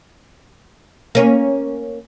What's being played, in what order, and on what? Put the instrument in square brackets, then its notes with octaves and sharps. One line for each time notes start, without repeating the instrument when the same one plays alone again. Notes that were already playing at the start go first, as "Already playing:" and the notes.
[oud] A#3 C#4